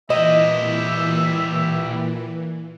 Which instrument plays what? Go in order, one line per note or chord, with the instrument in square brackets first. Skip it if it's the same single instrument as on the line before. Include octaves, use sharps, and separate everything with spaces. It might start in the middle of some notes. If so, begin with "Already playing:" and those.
[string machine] A#2 E3 [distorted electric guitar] E4 G4 [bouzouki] D#5 [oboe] E5